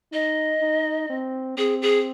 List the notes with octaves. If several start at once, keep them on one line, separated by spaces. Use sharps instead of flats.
D#4 D#5
D#4
C4
C4 G#4
G#4